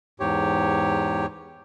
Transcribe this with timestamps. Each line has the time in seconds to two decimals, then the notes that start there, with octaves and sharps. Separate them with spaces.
0.20 E2 G#2 G4 C#5